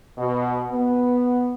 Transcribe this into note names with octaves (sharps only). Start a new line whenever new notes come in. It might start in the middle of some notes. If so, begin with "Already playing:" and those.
B2
B3